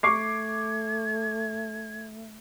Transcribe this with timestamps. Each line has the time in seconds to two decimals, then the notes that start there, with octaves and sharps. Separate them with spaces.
0.03 A3 C#6 D6 G#6 C7